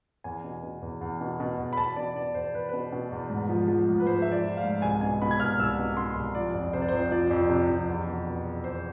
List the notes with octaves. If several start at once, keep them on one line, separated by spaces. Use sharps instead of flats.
E2 G#5
B2
B2
E2
E2
B2
B2
E2
B5
E2 A5
B2 D5
B2 D5
E2 C5
E2 B4
B2 B4
B2
E2
G#2
F3
F3
G#2
B4
G#2 C5
F3 E5
D5
F3
F5
G#2
C2 G#5
B2 G#5
B2 B5
G#6
C2 F6
C2 E6
B2
B2 C6
C2
F3 D5
F2
C3 C5
D5
F2 C5
F3 D5
F2
C3
F2
E2
B2
B2
E2
E2 C5